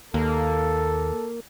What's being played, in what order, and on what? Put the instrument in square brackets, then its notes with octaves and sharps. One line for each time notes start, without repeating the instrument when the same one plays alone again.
[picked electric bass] D#2 [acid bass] A#3 [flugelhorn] A4